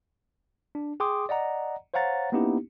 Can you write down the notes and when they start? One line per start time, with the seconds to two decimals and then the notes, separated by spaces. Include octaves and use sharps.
0.75 D4
1.00 G#4 G5 C6 D6 D#6
1.29 D5 D#5 F#5 A#5
1.94 C5 C#5 F5 F#5 A#5 A6
2.32 A#3 B3 C#4 D#4 E4 G4